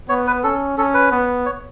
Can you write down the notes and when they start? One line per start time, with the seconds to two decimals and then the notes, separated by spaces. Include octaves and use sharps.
0.09 B3 C#5
0.27 B4
0.43 C#4 A4
0.78 C#4 A4
0.94 B4
1.12 B3
1.46 C#5